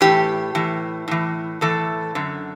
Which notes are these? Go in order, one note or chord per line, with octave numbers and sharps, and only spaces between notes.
A2 E3 G4
A2 E3
A2 E3
A2 E3 A4
F#2 D3